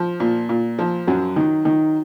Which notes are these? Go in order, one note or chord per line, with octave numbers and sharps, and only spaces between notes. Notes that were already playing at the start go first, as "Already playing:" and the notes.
Already playing: F3
A#2
A#2
F3
F#2 F#3
D#3
D#3